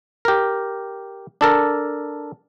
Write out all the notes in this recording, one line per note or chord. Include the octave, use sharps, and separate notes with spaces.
G4 A#4
D4 A4 A#4